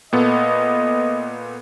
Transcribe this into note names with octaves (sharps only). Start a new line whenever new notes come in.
A#2 B3 A4 D#5